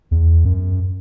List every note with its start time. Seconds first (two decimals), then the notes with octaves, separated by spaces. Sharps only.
0.11 E2
0.45 F#2